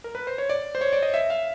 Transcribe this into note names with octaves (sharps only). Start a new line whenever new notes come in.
A#4
B4
C5
C#5
D5
C5
C#5
D5
D#5
E5
F5